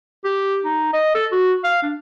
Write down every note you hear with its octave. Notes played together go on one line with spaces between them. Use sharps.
G4
D#4
D#5
A4
F#4
F5
D4